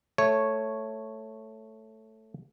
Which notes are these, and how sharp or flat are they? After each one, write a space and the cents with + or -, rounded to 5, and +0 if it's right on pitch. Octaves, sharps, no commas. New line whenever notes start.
A3 +0 C#5 -5